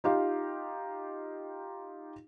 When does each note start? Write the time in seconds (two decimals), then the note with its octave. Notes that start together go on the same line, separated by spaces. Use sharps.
0.04 D#4 F4 G4 F5